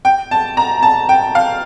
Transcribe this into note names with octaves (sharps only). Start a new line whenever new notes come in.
G5
A5
A#5
A5
G5
F5